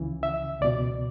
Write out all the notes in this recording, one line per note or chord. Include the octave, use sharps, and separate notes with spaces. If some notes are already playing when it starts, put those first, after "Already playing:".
Already playing: C#2 C#3 E3
E5
C#2 B2 D5